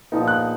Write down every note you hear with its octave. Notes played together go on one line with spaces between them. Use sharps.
A#1 A#2 F3 B3 D#4
F#6